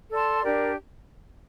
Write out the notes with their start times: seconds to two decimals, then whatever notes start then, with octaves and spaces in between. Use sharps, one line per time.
0.10 A4 D5 A5 C6
0.42 D4 G4 A#4 D5